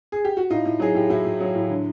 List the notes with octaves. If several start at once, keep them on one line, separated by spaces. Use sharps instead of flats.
G#4
G4
F#4
A2 D#4 F4
A2
F#3 G#4
A2 G4
A2 E4 F#4
A2
F#3
A2
D3